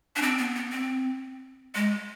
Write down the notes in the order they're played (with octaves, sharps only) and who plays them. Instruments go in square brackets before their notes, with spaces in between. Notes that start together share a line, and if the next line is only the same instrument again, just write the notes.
[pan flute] D4
C4
B3
B3
C4
G#3